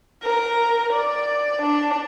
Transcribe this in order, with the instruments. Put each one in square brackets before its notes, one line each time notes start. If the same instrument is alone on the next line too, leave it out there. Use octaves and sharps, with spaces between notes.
[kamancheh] A#4
D5
D4